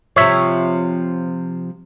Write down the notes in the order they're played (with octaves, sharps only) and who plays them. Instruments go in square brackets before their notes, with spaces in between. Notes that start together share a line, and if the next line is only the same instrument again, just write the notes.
[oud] C3 F3 [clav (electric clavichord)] C#5 E5